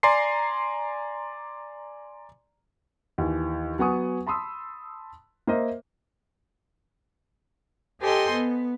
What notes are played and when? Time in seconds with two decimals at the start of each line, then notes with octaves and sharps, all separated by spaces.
0.03 D5 G#5 A#5 C6 C7
3.18 D#2 E3
3.79 F#3 B3 F#5 G#5 C#6 D#6
4.27 A5 B5 C6 D#6 E6
5.47 A#3 A#4 C5 D#5 E5
8.00 G4 A4 C5 D#5 G#5 C6
8.31 B3